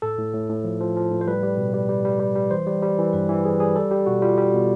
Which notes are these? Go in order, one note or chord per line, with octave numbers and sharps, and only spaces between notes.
A2 A4
A2
A2
A2
F3
F3
F3
A2
C5
G3 B4
G3
B2
G3
G3
G3
G3
G3
E3 C5
G3
G3
E3
G2 B4
E3
E3 G#4
G3 G#4
G3 A4
G3 G4
B2 F#4
G3 F4
G3
B2